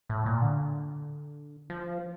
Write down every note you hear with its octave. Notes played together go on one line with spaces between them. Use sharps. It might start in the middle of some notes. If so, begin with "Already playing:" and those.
A2
A#2
D3
F3